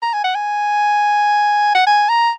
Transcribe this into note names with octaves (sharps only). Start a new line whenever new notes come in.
A#5
G#5
F#5
G#5
F#5
G#5
A#5